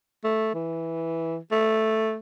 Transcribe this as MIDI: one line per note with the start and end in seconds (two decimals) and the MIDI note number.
0.24 0.54 57
0.54 1.37 52
1.52 2.17 57